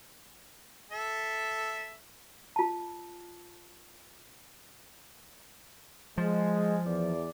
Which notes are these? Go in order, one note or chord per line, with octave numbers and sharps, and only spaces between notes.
A4 E5
F4 A5
F3 G#3
E2 D5